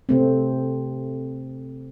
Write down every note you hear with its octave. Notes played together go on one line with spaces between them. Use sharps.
C3 A3 C4